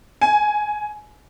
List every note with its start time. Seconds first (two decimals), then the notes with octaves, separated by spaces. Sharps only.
0.21 G#5